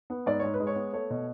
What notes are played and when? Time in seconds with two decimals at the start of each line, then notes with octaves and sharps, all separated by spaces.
0.10 B3
0.26 G#2 D5
0.39 G#2 C#5
0.54 B4
0.60 G#3
0.67 C#5
0.76 B3
0.93 A3 C#5
1.10 B2